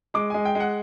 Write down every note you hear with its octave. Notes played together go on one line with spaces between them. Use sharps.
G#3 D6
G#3 G#5
G5
G#3
F#5